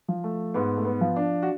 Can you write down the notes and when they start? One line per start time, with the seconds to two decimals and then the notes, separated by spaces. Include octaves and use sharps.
0.08 F3
0.24 A3
0.54 G#2 B3
0.77 A3
0.85 B3
1.01 F3
1.16 D4
1.42 F#4